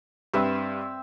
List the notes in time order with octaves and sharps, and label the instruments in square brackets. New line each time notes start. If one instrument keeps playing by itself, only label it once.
[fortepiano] G2 B4 [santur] C4 E5